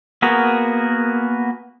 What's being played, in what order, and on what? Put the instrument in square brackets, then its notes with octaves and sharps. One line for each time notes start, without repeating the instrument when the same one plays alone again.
[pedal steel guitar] A#3 B3 F#4 G#4 A#4